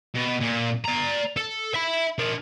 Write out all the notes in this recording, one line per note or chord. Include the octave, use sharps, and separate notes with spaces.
B2
A#2
D5 A#5
A4
E5 B5
D4 A#4